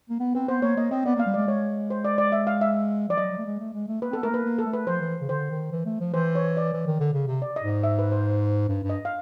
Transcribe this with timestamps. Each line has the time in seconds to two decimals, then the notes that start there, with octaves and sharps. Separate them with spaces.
0.10 A#3
0.20 B3
0.35 C4 B4
0.48 B3 C5
0.62 A#3 C#5
0.76 A#3 D#5
0.91 C4 D#5
1.05 B3 D5
1.15 A#3 F5
1.26 G3
1.34 G#3 D5
1.47 G#3 C#5
1.90 C5
2.05 D5
2.18 D5
2.32 E5
2.47 F5
2.61 E5
3.09 F3 D5
3.17 F#3 D#5
3.31 F#3
3.38 A3
3.46 G#3
3.60 A3
3.74 G#3
3.88 A3
4.02 A#3 B4
4.11 C4
4.13 A4
4.17 B3
4.23 A3 A#4
4.30 A#3 B4
4.45 A#3
4.59 A4
4.66 A3
4.73 B4
4.87 F3 C5
5.01 E3
5.21 C#3
5.29 D3 C5
5.51 D#3
5.72 E3
5.86 A3
6.00 F3
6.14 E3 C5
6.35 C#5
6.57 D5
6.73 E3
6.86 D#3
7.00 D3
7.13 C#3
7.27 C3
7.42 D5
7.56 D#5
7.63 G#2
7.69 D#5
7.83 E5
7.99 B4
8.12 C5
8.69 G2
8.83 G2
8.90 D#5
9.05 F5